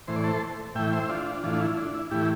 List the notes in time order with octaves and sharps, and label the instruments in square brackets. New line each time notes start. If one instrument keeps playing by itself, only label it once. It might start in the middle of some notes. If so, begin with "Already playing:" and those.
[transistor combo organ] A2 E3 C5
D5
A4 C5
A2 E3 E5 G5
C5 E5
D4 F4
D4
A2 E3 D4 F4
E4
D4
E4
A2 E3 E4 G4